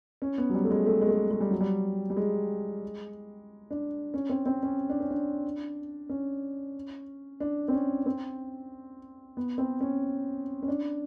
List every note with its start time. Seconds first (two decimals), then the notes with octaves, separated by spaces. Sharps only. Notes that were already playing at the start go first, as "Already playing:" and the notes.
0.22 C#4
0.38 B3
0.49 F#3
0.54 G3
0.64 A3
0.71 G#3
0.86 A3
1.01 G#3
1.08 A3
1.31 G#3
1.41 G3
1.51 F#3
1.61 G3
2.10 G3
2.17 G#3
3.71 D4
4.14 C#4
4.29 C4
4.46 C4
4.63 C#4
4.89 D4
5.00 C#4
5.11 D4
6.09 C#4
7.40 D4
7.68 C4
7.73 C#4
8.06 C4
9.37 B3
9.58 C4
9.81 C#4
10.63 C#4
10.68 D4